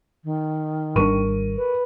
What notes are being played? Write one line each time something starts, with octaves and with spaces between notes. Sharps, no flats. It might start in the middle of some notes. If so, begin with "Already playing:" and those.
D#3
G#1 G3 D4 A#4 C#6 D#7
B4